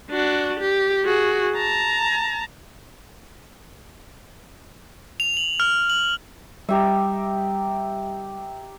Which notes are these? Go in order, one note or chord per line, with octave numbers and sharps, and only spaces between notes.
D4 F#4
G4
F#4 G#4
A5 A#5
F7
F#7
F6
F#7
G3 D#4 G4 E5